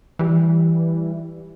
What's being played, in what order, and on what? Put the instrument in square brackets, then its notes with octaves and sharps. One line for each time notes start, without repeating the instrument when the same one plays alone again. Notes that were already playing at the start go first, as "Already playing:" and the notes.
[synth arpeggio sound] E3 G3